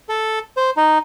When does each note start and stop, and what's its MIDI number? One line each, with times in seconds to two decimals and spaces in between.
0.09 0.39 69
0.57 0.70 72
0.77 0.98 63